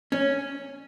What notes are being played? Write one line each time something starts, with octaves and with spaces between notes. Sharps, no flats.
C#4